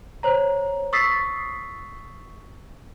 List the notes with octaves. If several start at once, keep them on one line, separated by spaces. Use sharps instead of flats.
C5 C#5 A#5
C#6 D#6 E6 A6 B6 C7